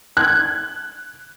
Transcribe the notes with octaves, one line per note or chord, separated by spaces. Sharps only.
F#6 G#6